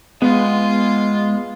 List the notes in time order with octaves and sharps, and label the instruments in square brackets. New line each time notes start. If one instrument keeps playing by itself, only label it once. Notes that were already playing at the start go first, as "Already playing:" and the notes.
[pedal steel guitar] G#3 [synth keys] B3 [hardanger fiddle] F4